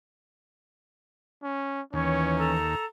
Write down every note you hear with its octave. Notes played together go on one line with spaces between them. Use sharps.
C#4
D#2 E3 C#4 C#5
A4 A#5